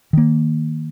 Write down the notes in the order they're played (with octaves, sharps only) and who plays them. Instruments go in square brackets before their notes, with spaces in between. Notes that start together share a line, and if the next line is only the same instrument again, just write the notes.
[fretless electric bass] D#3 A#3